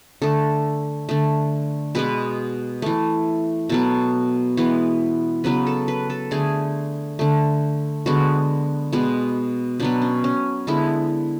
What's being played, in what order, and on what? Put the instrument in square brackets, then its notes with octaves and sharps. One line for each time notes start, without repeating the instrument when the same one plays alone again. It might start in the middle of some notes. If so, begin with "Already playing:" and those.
[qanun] D3 A3 A4
D3 A3
B2 G#3 B3 B4
E3 A3
B2 F#3 B3 A4
E3 G#3 B3
C#3 F#3 B3 B4
A4
B4
A4
D3 A3 G#4
D3 A3
D3 G#3 B3 F#4
B2 G#3 B3
B2 F#3 B3 D4
C#4
C#4
D3 G#3 B3 E4